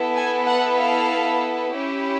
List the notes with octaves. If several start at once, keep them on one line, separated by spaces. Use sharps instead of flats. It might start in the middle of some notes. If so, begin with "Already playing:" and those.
Already playing: B3 E4 A4
G#5
F#5
F5
C#4 E4 G4